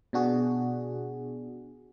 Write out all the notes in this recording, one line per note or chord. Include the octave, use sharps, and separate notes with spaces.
B2 D4 F#4 G#4